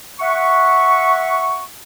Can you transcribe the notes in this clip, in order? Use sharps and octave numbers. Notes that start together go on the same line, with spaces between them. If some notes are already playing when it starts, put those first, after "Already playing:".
E5 F#5 C#6